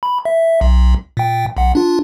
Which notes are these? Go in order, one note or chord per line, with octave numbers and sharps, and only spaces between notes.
B5
E5
B1
A#2 G5
B1 F#5
D4 F4